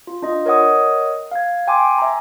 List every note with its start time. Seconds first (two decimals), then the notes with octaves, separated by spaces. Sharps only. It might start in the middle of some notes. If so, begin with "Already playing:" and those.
0.07 F4
0.22 D4 F4 D#5
0.46 A#4 C#5 D#5 F#5 D#6
1.31 F5 G#6
1.67 G5 G#5 C6 D6
1.98 E5 G#5 A#5